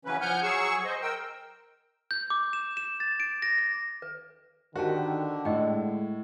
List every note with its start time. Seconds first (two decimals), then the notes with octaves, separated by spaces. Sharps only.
0.05 C#3 E3 F#3 C#4 B4
0.21 F3 F#5 G#5 F6 G6
0.43 F#3 G#4 C#6 E6
0.85 C5 D#5
1.02 A#4 G5 E6
2.11 G6
2.30 D6
2.53 E7
2.77 E7
3.00 A6
3.20 D7
3.42 A#6
3.58 A#6
4.02 B4
4.76 D3 D#3 F#4 G4 C5 A5
5.45 A2 G#3 D#5 G5